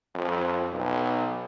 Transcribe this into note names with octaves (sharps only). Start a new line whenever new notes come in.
F2
B1